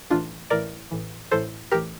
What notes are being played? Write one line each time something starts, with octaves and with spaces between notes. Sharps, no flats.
A1 A2 E3 D4 F4
A1 A2 E3 A#4 D5
A1 A2 E3
A1 A2 E3 A4 C5
A1 A2 E3 G4 A#4